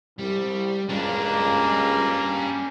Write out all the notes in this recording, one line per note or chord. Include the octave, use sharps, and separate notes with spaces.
C2 G3
C#2 G3 A#3 C#4 D4 D5